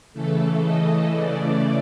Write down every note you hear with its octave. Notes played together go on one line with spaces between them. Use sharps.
C#3 E3 A3 A4
D#5
C#3 E3 A3 D5